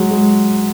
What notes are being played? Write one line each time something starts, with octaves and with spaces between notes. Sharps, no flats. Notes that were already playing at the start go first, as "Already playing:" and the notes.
Already playing: F#3 G#3
G#3